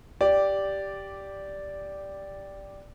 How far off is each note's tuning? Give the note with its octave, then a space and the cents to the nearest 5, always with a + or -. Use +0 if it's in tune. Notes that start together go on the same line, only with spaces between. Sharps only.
G4 +0 D5 -5